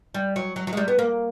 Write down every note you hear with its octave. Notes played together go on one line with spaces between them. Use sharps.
G3
F#3
F#3
F#3
G#3
G3
B3
A#3